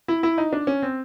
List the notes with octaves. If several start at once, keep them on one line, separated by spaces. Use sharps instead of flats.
E4
E4
D#4
D4
C#4
C4